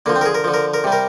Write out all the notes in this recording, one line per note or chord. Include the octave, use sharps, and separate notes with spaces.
D3 F3 A#3
C4
A#4
G#4
A#4
D3 F3
A#4
A#4
C3 G3
A#4